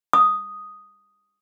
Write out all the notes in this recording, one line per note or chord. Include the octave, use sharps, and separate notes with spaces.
D#6